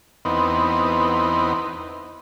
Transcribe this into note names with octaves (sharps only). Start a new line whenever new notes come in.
E2 B3 C4 D#4